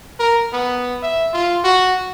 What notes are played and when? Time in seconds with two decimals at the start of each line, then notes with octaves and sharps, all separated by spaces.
0.19 A#4
0.53 B3
1.02 E5
1.33 F4
1.64 F#4